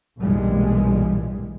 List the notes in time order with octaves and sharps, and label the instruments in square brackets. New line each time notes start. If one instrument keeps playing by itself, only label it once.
[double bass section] B1 G2 A#2 E3 G3 G#3